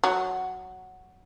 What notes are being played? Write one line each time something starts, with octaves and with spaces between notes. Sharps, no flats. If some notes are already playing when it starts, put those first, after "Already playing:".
F#3